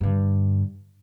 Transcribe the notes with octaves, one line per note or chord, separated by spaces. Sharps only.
G2 D3